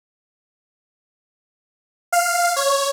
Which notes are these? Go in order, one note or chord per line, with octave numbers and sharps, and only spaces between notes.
F5
C#5